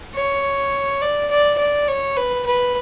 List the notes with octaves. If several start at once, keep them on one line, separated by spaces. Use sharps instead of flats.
C#5
D5
D5
D5
C#5
B4
B4